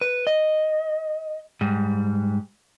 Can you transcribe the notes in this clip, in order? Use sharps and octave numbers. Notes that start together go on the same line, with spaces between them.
B4
D#5
G#2 G3